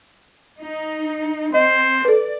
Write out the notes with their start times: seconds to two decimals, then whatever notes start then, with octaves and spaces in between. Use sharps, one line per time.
0.59 D#4
1.54 C4 C5 D#5
2.05 A4 B4 D5